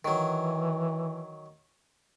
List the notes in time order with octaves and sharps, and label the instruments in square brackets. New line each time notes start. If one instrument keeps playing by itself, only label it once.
[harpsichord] D#3 F#3 [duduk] E3